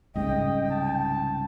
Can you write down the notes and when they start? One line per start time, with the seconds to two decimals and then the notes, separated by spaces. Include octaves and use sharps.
0.15 C2 G#2 C#3 D#5 G5
0.70 A5